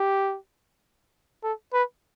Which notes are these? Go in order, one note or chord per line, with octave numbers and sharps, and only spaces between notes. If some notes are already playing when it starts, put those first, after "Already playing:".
Already playing: G4
A4
B4